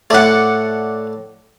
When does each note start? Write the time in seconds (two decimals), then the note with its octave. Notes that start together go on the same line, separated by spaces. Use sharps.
0.10 A2 A3 D5 F#5